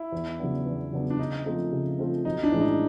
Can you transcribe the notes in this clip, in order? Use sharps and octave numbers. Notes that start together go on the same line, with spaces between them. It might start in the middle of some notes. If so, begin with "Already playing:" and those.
Already playing: E4
E2
C#3 F#3 B3 D4
E2
C#3 F#3 B3 D4
D4
C#3 D#4
F3 A3 C4 F4
C#3
F3 A3 C4 F4
B1 D#4
D4
A2 E3 G#3 C#4
D#4